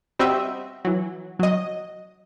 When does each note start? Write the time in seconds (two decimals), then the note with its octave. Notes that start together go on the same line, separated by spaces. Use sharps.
0.19 G3 C4 F#4 D#5 E5
0.85 E3 F#3
1.39 F#3 D#5